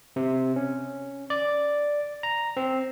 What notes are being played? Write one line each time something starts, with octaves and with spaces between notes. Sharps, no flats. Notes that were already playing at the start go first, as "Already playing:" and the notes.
C3
C#4
D5
A#5
C4